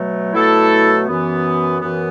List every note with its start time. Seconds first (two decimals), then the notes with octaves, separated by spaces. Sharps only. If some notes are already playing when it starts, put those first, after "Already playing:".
Already playing: B2 F#3 A3
0.33 B2 F#3 A3 E4 A4
1.07 F#2 E3 B3
1.80 F#2 E3 B3